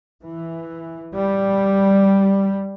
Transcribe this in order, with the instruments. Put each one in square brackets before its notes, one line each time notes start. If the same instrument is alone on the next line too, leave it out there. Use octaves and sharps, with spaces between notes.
[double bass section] E3
G3